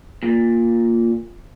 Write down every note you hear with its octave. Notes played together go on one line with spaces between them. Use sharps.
A#2